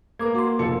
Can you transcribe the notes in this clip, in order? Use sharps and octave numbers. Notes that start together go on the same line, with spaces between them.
A#3 B4 D6 G#6
F#4 C6
F1 F4 A4 C#7